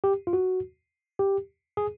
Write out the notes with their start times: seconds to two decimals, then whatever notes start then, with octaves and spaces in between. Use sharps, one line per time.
0.04 G4
0.27 F4
0.33 F#4
1.19 G4
1.77 G#4